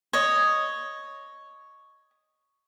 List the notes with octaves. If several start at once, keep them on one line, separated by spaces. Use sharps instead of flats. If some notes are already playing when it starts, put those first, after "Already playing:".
C#5 D#5